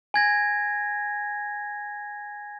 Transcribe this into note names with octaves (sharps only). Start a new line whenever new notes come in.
G#5 G#6 A#6